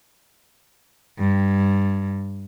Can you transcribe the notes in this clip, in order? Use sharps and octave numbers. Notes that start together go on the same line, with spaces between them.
G2